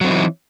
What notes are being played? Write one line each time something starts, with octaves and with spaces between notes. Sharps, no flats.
E3 F#3 C4 D#4